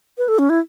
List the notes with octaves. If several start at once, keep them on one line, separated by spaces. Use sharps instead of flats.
B4
A4
C#4
E4